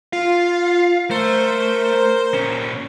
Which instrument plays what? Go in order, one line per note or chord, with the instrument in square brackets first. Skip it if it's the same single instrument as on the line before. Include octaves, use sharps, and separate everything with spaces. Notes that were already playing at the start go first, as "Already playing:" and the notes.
[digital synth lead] F4 [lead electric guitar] F5
[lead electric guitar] A3 [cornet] A#4 [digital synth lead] C5
[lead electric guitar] A#2 C#4